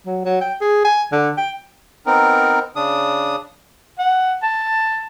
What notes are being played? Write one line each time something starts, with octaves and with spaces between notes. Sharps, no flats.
F#3
F#3
G5
G#4
G#5
D3
G5
B3 C4 D#4 A#4
C#3 D4 D#6
F#5
A5